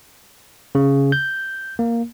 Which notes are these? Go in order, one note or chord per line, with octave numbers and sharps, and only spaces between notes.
C#3
G6
A#3